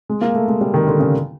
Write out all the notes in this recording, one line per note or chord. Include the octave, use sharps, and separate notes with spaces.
G#3
A#3
A3
G#3
G3
D#3
D3
C#3